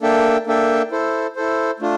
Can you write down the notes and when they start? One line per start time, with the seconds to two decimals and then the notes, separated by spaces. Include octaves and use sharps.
0.02 A#3 D4 A4 E5 G5
0.47 A#3 D4 A4 E5 G5
0.91 E4 A4 C5
1.36 E4 A4 C5
1.80 A3 D4 F4